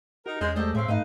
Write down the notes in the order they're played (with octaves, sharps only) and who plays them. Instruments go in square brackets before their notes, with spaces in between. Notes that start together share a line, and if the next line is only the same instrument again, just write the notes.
[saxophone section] D#4 A#4 [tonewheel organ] F#4
[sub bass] E2 [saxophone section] G#3 [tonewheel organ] C#4 [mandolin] G#4 A#4 C5
[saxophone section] F#3 G4 D#5 [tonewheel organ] G#3 A3 [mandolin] A4 C5 D5
[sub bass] A2 [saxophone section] C#3 C4 C#4 [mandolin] E5 F5
[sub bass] G#2 [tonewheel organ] A3 [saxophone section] D#4 [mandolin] B4 D#5 F5